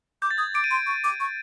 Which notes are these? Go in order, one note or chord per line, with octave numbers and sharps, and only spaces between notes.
D6 G6
A6
D#6 G#6
D6 D7
D#7
C6 D7
C#6
D6
C#6